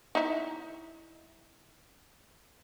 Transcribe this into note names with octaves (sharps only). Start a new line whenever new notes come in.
D#4 E4